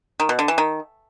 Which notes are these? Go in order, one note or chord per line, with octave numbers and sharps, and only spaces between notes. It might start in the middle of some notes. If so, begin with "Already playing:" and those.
D#3
B2
D3
E3
D#3